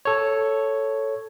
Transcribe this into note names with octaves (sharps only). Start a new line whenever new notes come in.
A4 C#5